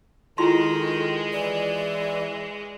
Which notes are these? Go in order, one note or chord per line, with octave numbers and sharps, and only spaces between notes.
D#3 G#3 E4 F4 A4 C6
E3 D5